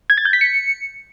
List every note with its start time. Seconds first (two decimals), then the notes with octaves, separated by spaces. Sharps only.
0.10 G#6
0.18 A6
0.25 G6
0.33 B6
0.41 C#7